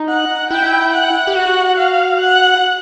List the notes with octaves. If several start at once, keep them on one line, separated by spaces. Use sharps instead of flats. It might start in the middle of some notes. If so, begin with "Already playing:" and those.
Already playing: D#4
F#5
E4 G5
F#5
G4
F#4 F#5
F5
F#5